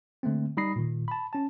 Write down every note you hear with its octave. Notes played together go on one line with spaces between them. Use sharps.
D3 A3 A#3 C4
G3 D#4 B5 D#6 A#6 C7
A#2 D#3
A5 B5
C#4 A5